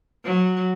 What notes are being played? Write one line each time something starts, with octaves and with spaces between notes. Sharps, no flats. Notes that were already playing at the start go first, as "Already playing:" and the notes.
F#3